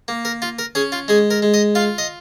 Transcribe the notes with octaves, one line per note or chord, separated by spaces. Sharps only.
A#3
A#4
F4
A#4
C#4 G#4
F4
G#3 G#4
A#4
G#3
D#5
F4 F5
D#5